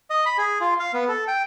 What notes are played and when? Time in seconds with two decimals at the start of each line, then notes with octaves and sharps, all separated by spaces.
0.10 D#5
0.26 B5
0.38 G#4
0.61 F4
0.80 F5
0.93 B3
1.09 A4
1.28 G5